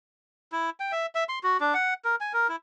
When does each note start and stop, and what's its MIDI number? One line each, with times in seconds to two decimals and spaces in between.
0.52 0.70 64
0.80 0.92 79
0.92 1.06 76
1.15 1.24 76
1.29 1.39 84
1.43 1.57 66
1.60 1.74 62
1.74 1.94 78
2.05 2.16 70
2.21 2.32 80
2.33 2.48 70
2.49 2.56 64